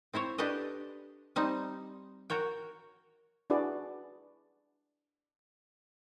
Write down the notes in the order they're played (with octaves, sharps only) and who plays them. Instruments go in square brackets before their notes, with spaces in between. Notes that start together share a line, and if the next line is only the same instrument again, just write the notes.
[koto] C4 E4 C5 C#5
D4 G4 A4 B4 D#5
G3 C4 D#4
F#4 A#4 C#5 G5
[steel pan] D4 E4 F#4 G#4 B4 D5